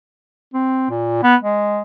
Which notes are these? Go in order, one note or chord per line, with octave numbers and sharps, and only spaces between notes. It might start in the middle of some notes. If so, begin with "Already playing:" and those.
C4
A#2
B3
G#3